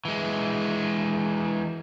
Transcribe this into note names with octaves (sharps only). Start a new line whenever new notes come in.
E3 G#3